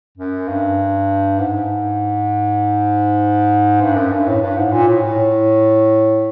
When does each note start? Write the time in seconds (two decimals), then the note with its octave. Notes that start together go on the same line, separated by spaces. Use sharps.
0.17 F#2
0.48 G2
1.39 G#2
3.81 G2
3.96 F#2
4.12 G2
4.27 A2
4.42 G2
4.57 G#2
4.72 A#2
4.88 A2
5.03 A2